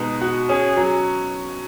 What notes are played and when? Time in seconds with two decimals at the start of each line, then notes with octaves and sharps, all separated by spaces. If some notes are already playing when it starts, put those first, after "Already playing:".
Already playing: B2 G#3 D#4
0.21 F#4
0.49 C#4 G#4
0.77 F#3